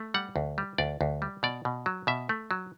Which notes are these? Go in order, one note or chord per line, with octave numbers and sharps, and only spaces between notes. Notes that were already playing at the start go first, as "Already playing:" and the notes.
Already playing: A3
G3 F#5
D2
G3
D2 D5
D2
G3
B2 D5
B2
F#3
B2 E5
A3
F#3